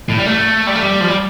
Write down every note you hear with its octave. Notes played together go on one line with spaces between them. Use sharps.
A2
G3
A3
G3
A3
G3
F3
G3